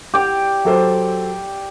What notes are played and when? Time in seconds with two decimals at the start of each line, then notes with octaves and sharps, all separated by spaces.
0.14 G4 D5
0.65 F#3 A4 C5